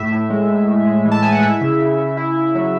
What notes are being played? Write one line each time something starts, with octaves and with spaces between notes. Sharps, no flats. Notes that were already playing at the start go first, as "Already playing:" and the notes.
Already playing: A2 E5
A2
G#3
A2
A2
G#3
E3
A5
G#3 G#5
F#5
E4 E5
C#3
C#3
C#3
E4
E4
F#3